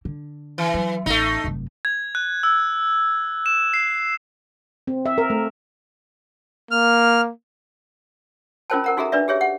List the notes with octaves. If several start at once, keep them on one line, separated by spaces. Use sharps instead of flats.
D3
E3
F#3
A1 A3 D#4
F1 F#2
G#6
F#6
E6
E7
C7
C4
E5
A#4
A3
A#3 F6
C#4 F4 A#4 C5 G5 A5
A#4 F#5 A#5
D#4 F#4 G#4 A4 E5 A#5
D4 B4 D5 E5
G4 G#4 C#5 E5
F#5